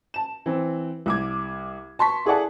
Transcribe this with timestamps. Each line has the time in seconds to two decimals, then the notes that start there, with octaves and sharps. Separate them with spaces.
0.14 A5 E7
0.46 E3 C4
1.06 C2 D6 G#6
1.99 A5 C6 C#6 B6
2.26 E4 G#4 A4 D5 F#5 A5